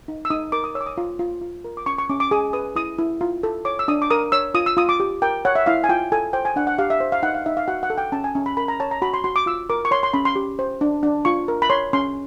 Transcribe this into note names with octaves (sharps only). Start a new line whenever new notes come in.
D#4
E6
D#4 D#6
A#4 D6
D#6
C#5 E6
D6
D#6
F4
F4
F4
A#4
D6
C#4 C#6
C#6
C#4 D6
D6
G#4 D#6
B4 D#6
E4 D#6
E4
F4
A4
C#5 D6
E6
D4 D#6
D6
A#4 D#6
C#5 E6
F4 D#6
E6
F4 D#6
D6
G4
A#4 G5
C#5 F#5
E5
E4 F5
G#5
F4 G5
A4 G#5
C5 G5
G#5
D4 F#5
F#5
G4 F5
E5
C5
F5
D#4 F#5
F5
D#4 E5
F5
F#4 F#5
F#5
A4
G5
C#4 A5
G#5
C#4
B5
A#4 B5
A#5
C#5 A5
A#5
F#4 B5
C6
F#4 C6
D6
F4 E6
A#4 D6
C#6
C#5 C6
C6
C#4 B5
C6
G4
C5
D4
D4
F4 C#6
A#4
B5
C#5 C6
C#4 C6